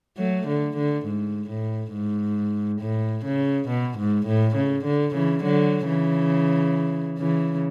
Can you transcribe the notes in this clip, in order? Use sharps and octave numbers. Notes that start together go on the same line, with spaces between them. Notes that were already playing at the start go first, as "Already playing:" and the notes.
F#3 A3
D3
D3
G#2
A2
G#2
A2
C#3
B2
G#2
A2
C#3
D3
C#3 E3
D3 F#3
C#3 E3
C#3 E3